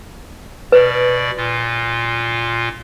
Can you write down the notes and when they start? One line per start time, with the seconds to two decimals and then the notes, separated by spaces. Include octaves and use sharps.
0.72 B2 B4 D5
1.37 A#2 F4